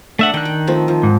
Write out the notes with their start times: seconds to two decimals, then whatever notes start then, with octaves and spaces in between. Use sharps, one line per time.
0.19 A3 D4 E5 F#5
0.34 D#3 G5 F#6
0.45 G5
0.67 F3 A3 C4
0.88 F3
1.03 G#2